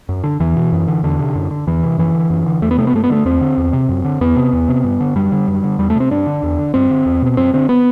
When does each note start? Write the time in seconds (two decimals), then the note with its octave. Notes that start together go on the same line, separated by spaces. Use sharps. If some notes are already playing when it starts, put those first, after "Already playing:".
0.09 F#2
0.24 D3
0.40 E2 E3
0.56 B2
0.72 F#2
0.87 D3
1.03 E2 D3
1.19 C3
1.35 F#2
1.51 D3
1.67 E2 E3
1.83 C3
1.98 F#2 E3
2.15 D3
2.30 F#2
2.46 D3
2.62 E2 A3
2.71 B3
2.78 C3 A3
2.87 B3
2.93 G2 A3
3.04 B3
3.10 D3 A3
3.25 E2 C4
3.41 D3
3.58 E2
3.73 C3
3.89 F#2
4.04 D3
4.21 E2 B3
4.36 C3
4.53 E2
4.69 C3
4.84 G2
5.00 D3
5.15 F#2 G3
5.32 D3
5.48 F#2
5.64 D3
5.78 E2 G3
5.90 A3
5.95 C3
6.00 C4
6.11 G2 D4
6.27 D3
6.43 E2
6.58 D3
6.74 G2 C4
6.90 D3
7.06 E2
7.22 B2
7.37 F#2 C4
7.53 D3 C4
7.69 B3